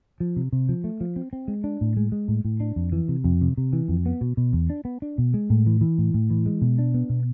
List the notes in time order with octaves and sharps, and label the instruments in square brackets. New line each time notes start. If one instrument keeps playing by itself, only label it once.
[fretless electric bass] F3
C3
C3
F3
A3
F3
C4
C4
G#3
D4
A2
G#3
G#3
A2
A2
D4
F2
E3
C3
F2
C3
C3
E3
F2
B3
B2
B2
E2
D4
B3
D4
B2
G#3
A2
E3
E3
A2
A2
E3
G#3
B2
D4
B3
B2